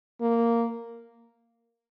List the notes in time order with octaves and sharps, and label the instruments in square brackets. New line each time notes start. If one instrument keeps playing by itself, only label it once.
[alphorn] A#3